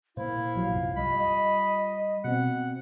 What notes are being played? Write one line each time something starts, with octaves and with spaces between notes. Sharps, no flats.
A#2 A#3 E4 C5 F5
A1 F3 F#3
C2 F#2 C3 F4
G3 D#5 B5
D#5
B2 C4 F#5